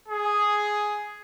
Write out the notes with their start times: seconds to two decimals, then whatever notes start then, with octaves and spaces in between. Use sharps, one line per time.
0.09 G#4